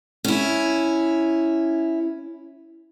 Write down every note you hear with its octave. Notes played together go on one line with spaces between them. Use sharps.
C#4 E4